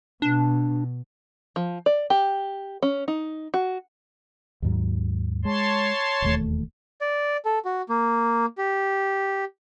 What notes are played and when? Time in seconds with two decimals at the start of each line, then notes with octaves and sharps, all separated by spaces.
0.22 B2 D4
1.56 F3
1.86 D5
2.10 G4
2.83 C#4
3.08 D#4
3.54 F#4
4.62 D#2 G#2 F#3
5.45 G#3 C#5 A5 C6
6.22 E1 D#2 A3
7.01 D5
7.45 A4
7.65 F#4
7.89 A#3
8.58 G4